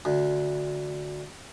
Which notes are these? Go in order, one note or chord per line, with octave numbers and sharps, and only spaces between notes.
D2